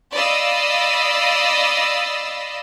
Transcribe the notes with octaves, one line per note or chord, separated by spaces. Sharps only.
D5 D#5 F5 B5 D#6 E6